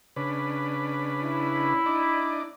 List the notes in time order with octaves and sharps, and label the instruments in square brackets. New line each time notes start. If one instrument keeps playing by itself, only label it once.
[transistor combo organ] C#3 D4 B4
[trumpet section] E4
[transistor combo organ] D4 D#4 D5